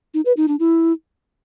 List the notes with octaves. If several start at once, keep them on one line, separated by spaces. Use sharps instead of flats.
D#4
B4
D#4
D4
E4